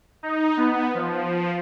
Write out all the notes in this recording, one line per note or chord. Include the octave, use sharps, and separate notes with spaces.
D#4
B3
F3